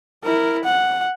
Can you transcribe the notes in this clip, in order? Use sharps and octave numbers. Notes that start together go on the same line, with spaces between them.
E4 A#4
F#5